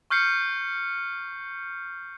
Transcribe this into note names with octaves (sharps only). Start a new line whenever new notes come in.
C#6 F6 G6 C7 C#7